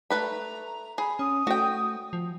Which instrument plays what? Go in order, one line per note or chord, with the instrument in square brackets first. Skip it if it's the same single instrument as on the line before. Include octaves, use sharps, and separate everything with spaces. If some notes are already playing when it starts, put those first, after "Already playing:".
[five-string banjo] A3 B4 B5 [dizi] A#5
[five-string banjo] G#4 [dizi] B5
[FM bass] C#4 [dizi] D#6
[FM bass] A3 [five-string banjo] F#4 G5
[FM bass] F3